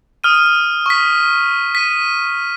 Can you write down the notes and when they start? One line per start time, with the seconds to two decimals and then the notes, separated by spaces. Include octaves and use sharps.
0.24 D#6 F6 D#7
0.86 C#6 B6
1.75 B6 D#7